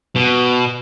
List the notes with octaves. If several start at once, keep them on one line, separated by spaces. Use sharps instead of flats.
B2